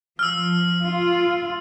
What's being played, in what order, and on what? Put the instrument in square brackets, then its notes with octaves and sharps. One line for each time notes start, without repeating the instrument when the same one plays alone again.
[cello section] F3 [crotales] E6 F6
[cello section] F4